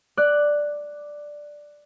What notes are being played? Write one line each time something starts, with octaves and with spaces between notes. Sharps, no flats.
D5 F#6